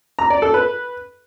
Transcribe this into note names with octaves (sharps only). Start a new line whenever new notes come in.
A#5
D5
A4
B4